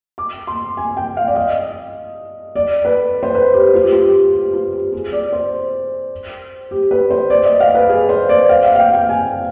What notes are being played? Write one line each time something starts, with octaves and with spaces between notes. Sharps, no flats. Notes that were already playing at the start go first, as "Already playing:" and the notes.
D6
C6
G#5
G5
F5
D5
D#5
D5
B4
C5
B4
G4
F4
G4
F4
G4
G4
F4
G4
G#4
D5
C5
G4
B4
C5
D5
D#5
F5
B4
G#4
C5
D5
F5
F5
F5
G5
G5
G#5